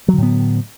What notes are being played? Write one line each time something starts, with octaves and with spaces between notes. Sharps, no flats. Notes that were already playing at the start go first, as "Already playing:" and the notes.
A2 D3 F#3 B3